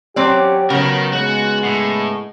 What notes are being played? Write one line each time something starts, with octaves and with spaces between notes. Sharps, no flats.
F#3 C4 C#4 G4 D5
C#3 F#3 B3 F#4 A#4 G5
G#3 B3 F#4
A2